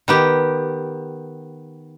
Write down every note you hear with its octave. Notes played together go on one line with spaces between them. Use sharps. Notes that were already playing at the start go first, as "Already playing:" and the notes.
D#3 B3 G4